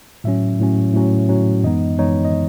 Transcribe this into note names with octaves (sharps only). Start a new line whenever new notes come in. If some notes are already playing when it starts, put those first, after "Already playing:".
A2 F#3 C#4 E5
A2 F#3 C#4
A2 F#3 C#4
A2 F#3 C#4
F#2 E3 G#3 B3 D#4 D#5
F#2 E3 G#3 B3 D#4 C#5
D#5